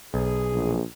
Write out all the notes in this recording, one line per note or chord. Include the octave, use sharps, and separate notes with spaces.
B1 G#4
A#1